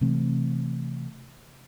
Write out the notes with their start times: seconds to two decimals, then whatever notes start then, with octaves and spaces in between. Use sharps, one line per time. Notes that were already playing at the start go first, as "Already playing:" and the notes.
0.01 C3 E3 A3 C4